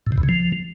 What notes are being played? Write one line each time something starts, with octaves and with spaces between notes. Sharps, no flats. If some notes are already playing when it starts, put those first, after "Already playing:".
A2
C3
E2
C#3
F3